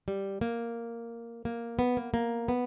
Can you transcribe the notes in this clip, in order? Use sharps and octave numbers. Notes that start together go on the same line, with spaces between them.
G3
A#3
A#3
B3
A#3
A#3
B3